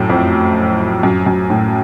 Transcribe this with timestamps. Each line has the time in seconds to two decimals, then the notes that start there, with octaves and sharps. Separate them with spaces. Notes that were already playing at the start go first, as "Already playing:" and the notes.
Already playing: F#2 A2
0.10 F2
1.03 F#2
1.26 F#2
1.50 A2